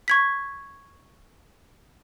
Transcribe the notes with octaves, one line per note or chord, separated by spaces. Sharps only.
C#6 G#6 B6